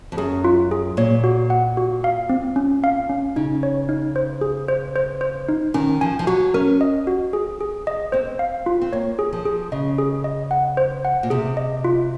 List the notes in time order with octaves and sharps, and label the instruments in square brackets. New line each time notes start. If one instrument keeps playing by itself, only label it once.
[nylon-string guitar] F2
[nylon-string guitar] F#2 [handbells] G#4
[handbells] F4
G#4
[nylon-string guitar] A#2 [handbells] C#5
[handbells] F#4
F#5
F#4
F5
C4
C#4
F5
C#4
[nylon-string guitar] C#3 [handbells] D#4
[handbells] C#5
D#4
C5
G#4
C5
C5
C5
D#4
[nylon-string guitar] D#3 [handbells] C#4
[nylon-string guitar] F3 [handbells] G#5
[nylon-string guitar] F3
[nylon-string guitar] F#3 [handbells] F#4
[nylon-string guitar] C#4 [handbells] A#4
[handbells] D#5
F#4
G#4
G#4
D#5
[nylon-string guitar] C4 [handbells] C5
[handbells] F5
F4
[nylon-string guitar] C4
[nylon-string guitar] A#3 [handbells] C#5
[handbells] G#4
[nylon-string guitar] F3
[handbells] G#4
[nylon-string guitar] C#3 [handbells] D#5
[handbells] G#4
D#5
F#5
C5
F#5
[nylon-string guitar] A#2
[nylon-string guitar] C3 [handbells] G#4
[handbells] D#5
F4